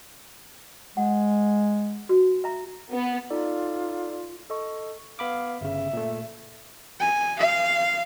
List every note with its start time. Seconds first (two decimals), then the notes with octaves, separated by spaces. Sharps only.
0.97 G#3 F#5
2.09 F#4
2.44 E5 A#5
2.91 B3
3.30 D#4 F4 A4 D5
4.50 A4 D#5 C#6
5.19 B3 F5 B5 D6
5.61 G1 C#3 E5
5.93 A#2 A3
7.00 G#5
7.39 F5